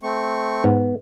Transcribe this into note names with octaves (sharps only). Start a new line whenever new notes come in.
A3 C4 C#6
G#2 B3